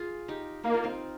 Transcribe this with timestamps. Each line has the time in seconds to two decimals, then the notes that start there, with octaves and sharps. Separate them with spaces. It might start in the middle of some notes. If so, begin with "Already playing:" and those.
Already playing: F4 G#4
0.28 D#4 G4
0.63 A#3 D#4
0.74 F4
0.84 C4 D#4